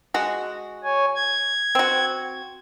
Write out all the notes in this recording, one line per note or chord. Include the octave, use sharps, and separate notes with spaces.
G#3 F#4
C#5 G#5
G#6
C4 F#4